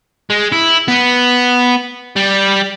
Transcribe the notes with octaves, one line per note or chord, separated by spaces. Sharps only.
G#3
E4
B3
G3